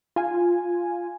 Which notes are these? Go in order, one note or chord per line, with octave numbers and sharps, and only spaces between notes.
F4 G#5